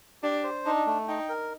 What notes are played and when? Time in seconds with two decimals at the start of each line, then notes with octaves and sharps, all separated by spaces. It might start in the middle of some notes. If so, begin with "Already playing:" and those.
0.23 D4 G4
0.44 C5
0.65 D4 D#4
0.86 A3
1.08 D#4 G5
1.29 A#4